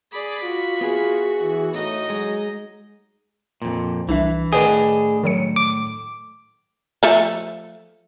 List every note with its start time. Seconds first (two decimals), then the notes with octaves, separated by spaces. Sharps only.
0.12 G#4 D5 B5
0.43 F4 F#4
0.81 B3 G#4
1.41 E3
1.74 A2 D#4 D#5
2.10 F#3 G#3
3.62 F2 A#2
4.09 C2 E3 D4 E5
4.53 A2 D#3 D4 G#4 B4 D#5 F#5
5.23 D#3 F#3 C#7
5.56 D6
7.03 F3 A3